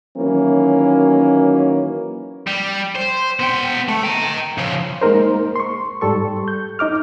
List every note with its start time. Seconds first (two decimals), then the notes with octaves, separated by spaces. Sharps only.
0.18 D#3 E3 F#3 A#3 C#4
2.47 G3
2.96 C5
3.40 B3 G5
3.89 A3
4.03 G5 A#5
4.58 C#3 F3
5.02 G#3 A#3 D#4 A#4 C5
5.56 C6 C#6
6.01 G#2 G3 A4 C#6
6.48 G6
6.79 D#4 D#5 D6 F6